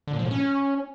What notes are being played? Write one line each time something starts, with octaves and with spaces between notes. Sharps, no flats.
D3
A#2
F3
A2
C#4